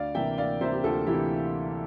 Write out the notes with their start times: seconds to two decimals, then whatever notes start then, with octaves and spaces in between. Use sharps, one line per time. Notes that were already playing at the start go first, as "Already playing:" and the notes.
Already playing: D2 D5 F5
0.15 C3 E3 A#3 E5 G5
0.38 D2 D5 F5
0.61 C3 E3 A#3 C5 E5
0.73 G4
0.84 D2 F4 A4
1.07 C3 E3 A#3 E4 G4